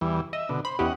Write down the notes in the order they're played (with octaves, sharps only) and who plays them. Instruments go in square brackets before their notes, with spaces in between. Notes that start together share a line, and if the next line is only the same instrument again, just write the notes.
[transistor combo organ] E2 E3 G3
[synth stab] D#5 [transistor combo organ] E5
[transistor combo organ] B2 D3
[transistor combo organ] C5 [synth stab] B5
[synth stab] E2 E4 G4 [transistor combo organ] C#4 D#5 F#5